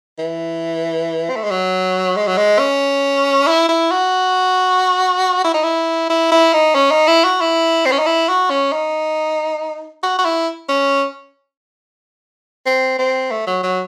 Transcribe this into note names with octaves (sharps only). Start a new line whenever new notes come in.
E3
C4
A3
G#3
F#3
G#3
F#3
G#3
C#4
E4
E4
F#4
E4
D#4
E4
E4
E4
D#4
C#4
D#4
E4
F#4
E4
C4
C#4
D#4
E4
F#4
C#4
D#4
F#4
F#4
E4
C#4
C4
C4
A3
F#3
F#3